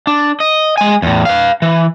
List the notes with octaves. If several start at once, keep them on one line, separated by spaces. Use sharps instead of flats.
D4
D#5
G#3 G#5
E2 A2
B4 F5
E3